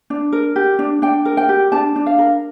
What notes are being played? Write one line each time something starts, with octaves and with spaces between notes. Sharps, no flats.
D4
A#4
G4
D4
D4 G5
A#4
G5
G4
D4 A5
D4
F5
A#4